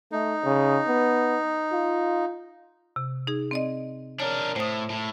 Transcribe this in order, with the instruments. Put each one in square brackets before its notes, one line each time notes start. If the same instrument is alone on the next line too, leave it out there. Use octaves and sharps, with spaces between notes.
[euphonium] A3 [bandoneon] D#4
[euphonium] C#3
B3
F4
[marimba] C3
D#4 G#4
C4 D5 D#5
[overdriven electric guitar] D4 A#4 [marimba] C#5
[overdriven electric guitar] A2 [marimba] C5 D#6
[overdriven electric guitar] A2